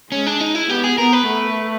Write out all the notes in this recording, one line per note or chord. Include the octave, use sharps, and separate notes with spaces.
G#3 C#4
D4
D#4
E4
B3 G4
G#4
B3 A#4
B4
A3